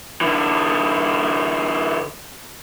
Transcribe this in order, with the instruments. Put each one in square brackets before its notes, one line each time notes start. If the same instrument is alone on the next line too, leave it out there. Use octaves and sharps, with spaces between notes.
[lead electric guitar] D3 E3